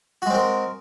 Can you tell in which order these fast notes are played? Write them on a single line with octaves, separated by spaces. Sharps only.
F#4 G#3 C4 A#4